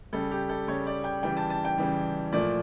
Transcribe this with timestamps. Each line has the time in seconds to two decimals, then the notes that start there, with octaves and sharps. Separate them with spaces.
0.13 C#3 G3 A4
0.31 G4
0.49 A4
0.68 C#3 G3 C#5
0.87 D5
1.04 G5
1.23 C#3 E3 G3 G5
1.37 A5
1.50 A5
1.65 G5
1.78 C#3 E3 G3
2.33 A#2 F3 A3 D5